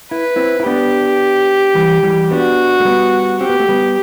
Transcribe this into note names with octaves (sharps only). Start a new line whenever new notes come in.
E4 B4
C4 E4
E4
B3 D4 G4
E3 G3
E3 G3
B3 D4 F#4
A3
G3 B3
C4 G4
B3
A3
G3 B3